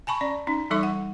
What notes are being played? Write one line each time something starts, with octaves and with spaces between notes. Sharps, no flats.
G#5 A5 B5 C#6
C#4 D5
C#4 D#4
E3 G3 D#4 A4 E5 C#6
F#5